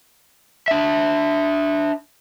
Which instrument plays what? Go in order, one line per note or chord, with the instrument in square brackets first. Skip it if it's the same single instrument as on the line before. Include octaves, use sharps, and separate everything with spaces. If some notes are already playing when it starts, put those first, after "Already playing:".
[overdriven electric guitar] D4 E5